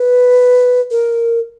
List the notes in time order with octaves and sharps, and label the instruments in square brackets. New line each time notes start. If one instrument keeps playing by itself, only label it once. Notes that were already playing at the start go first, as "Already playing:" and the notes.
Already playing: [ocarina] B4
A#4